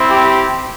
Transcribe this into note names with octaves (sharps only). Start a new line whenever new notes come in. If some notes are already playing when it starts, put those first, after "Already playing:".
Already playing: C4 E4
G4